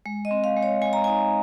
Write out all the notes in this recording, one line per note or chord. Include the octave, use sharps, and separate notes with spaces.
G#3
D#5
C4
F5
G#3
C#5
G#3 G#5
A#5
D#4 G#5